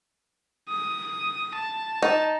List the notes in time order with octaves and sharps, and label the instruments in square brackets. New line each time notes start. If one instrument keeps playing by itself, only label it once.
[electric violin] D#6
A5
[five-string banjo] D#4